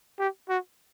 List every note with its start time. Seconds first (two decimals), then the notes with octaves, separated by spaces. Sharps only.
0.19 G4
0.49 F#4